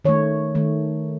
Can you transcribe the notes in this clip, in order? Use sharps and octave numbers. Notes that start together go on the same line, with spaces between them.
D#3 A3 C#5
D#3 A3